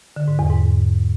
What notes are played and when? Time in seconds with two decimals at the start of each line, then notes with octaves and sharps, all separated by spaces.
0.16 D3
0.28 G#2
0.39 E2
0.50 G#2